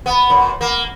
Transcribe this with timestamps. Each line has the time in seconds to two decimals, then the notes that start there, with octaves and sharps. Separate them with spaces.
0.06 B3
0.30 F#2
0.61 A#3